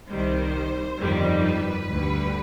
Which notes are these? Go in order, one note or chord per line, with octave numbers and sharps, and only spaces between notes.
C2 C3 D#3 G3 C5
G1 F2 D#3 G3
B4
D2 D3 G3